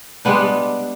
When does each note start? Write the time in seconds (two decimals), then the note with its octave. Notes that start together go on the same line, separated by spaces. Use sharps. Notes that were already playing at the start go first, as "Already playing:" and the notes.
0.25 G3 G#3 B3 D4